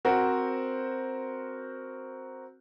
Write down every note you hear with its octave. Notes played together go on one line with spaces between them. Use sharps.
C4 F#4 A#4 C5